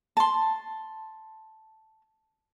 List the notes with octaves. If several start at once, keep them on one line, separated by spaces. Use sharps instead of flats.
A5 C6